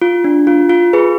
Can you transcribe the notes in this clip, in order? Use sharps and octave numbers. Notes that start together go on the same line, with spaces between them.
F4
D4
F4
F4
G#4 B4